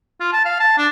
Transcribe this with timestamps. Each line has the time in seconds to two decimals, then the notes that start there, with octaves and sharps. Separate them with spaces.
0.20 F4
0.32 A5
0.45 F5
0.60 A5
0.78 D4